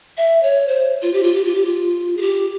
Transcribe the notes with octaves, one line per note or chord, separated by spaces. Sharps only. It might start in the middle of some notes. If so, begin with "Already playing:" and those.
E5
C#5
C5
F4
G4
F4
G4
F4
G4
F4
G#4
G4